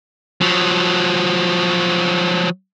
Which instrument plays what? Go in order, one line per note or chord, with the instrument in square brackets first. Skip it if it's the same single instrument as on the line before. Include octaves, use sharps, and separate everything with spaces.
[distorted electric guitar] F3 F#3